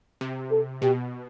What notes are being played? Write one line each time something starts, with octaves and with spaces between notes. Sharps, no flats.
C3
A4
B2 G4